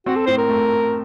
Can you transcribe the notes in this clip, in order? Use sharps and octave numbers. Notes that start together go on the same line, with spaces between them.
C4 F#4
A4
A2 C5
A#4
A3